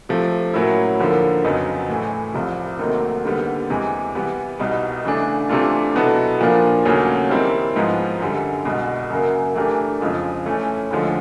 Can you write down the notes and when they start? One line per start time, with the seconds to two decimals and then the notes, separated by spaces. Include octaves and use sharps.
0.09 C3 F3 A3
0.54 A2 F#3 A#3 C#4 E4
1.00 D#2 D3 F3 A#3
1.44 F2 C#3 F#3 B3 D#4
1.89 A2 E3 A3
2.34 C2 C3 F3
2.79 D#2 D#3 F#3 A3 C4
3.25 D#2 D3 G3 B3
3.70 E2 C3 E3 G#3
4.15 E3 G3 B3
4.59 C2 B2 G3 B3 D#4
5.05 C#3 E3 A3 D4
5.49 C3 E3 A3 D4 F4
5.95 B2 F#3 B3 E4 A4
6.40 A#2 F3 A#3 D4 F4
6.85 D#2 C#3 F#3 A3 C#4
7.30 D#3 G3 C4 E4
7.76 G#2 F3 G#3 B3
8.20 F#2 D3 G3
8.65 C2 B2 G#3
9.10 F#2 C#3 F#3 A#3
9.55 E3 A3 D4 G4 A#4
10.00 F2 C#3 F3 G#3
10.46 E3 A3 C#4
10.91 D2 D3 F3 G#3